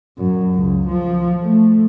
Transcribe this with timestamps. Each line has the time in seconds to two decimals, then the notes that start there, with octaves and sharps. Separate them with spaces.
0.18 F#2
0.54 C#2
0.88 F3
1.43 A3